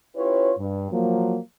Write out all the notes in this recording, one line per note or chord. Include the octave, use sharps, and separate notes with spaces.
C#4 E4 F4 G4 B4 C#5
G2
F3 F#3 A#3